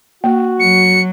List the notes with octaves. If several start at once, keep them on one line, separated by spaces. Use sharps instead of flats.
A#3 F#4
F#3 C#7